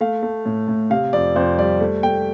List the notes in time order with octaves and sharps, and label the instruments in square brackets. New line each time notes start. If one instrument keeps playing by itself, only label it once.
[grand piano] A3 F5
A3
A2
A2
C3 F5
F2 D5
F2 C5
G3 D5
A3
A3 G5